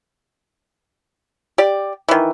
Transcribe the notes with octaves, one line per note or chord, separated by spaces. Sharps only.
G4 D5
D#3 E3